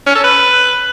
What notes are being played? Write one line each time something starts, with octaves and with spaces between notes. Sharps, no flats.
C#4
A4
B4